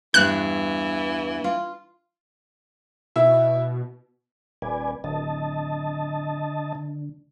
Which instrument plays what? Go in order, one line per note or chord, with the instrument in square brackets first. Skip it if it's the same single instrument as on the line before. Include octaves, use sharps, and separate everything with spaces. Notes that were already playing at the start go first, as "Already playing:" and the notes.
[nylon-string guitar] E2 G2 B3 [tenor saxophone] E3 [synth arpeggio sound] F#6
[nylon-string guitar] F4
[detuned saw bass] B2 [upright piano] E4 E5
[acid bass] D#1 [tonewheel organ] B4 D5 G#5
[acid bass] D1 [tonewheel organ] D3 D#5 A5
[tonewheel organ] D3